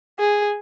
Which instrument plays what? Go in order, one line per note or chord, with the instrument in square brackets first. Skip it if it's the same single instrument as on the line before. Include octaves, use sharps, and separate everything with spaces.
[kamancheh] G#4